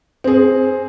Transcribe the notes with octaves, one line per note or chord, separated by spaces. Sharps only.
C4 G#4